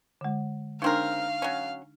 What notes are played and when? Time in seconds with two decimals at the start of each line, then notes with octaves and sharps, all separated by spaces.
0.21 D3 G#3
0.82 C#3 C4 D4 D#4 A#4 F5
1.42 F#3 C#4